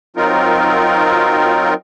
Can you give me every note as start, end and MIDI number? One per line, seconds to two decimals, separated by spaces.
0.16 1.74 54
0.16 1.74 60
0.16 1.74 63
0.16 1.74 65
0.16 1.74 70